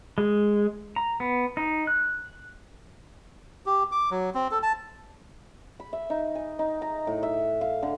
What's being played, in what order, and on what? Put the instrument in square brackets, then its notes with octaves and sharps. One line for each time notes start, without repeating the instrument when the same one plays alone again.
[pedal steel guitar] G#3
A#5
B3
D#4
F#6
[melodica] G4
D6
F#3
C4
A4
A5
[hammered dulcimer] B5
E5
D#4
G#5
D#4
A#5
A2
E5
F5
D3